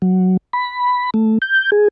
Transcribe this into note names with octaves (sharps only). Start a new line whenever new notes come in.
F#3
B5
A3
G6
G#4